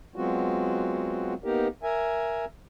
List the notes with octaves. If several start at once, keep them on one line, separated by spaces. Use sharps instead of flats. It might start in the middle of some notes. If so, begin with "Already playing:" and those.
F#3 G#3 B3 C4 F4 F#4
A#3 B3 D#4 G4 A#4
A#4 E5 G#5